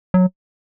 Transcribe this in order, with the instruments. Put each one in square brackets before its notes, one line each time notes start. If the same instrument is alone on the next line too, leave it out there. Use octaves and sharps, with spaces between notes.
[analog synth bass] F#3